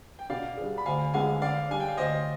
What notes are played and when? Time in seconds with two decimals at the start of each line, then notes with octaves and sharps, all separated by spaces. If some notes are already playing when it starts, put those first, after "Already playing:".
0.19 G5
0.30 B2 D5 F5
0.57 G3 D4 G#4
0.78 B5
0.86 D2 F5 G#5
1.14 D3 G#3 B3 D4 F5 G#5
1.42 D3 D5 F5
1.69 G3 D4 G#5
1.80 G5
1.88 F5
1.97 D2 C5 D#5